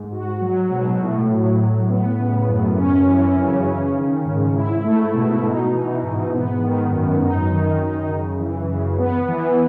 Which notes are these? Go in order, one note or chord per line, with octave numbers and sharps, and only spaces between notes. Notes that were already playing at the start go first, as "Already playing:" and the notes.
Already playing: G#2
F#4
F#3
B2
A2
F#3
A2
B3
C#3
F#2
C#4
E3
C#3
C#4
D#3
G#2
E4
A3
B2
D#4
E3
G#2
B3
D#3
F#2
D#4
D#3
F#2
C#3
E3
C#3
B3
E3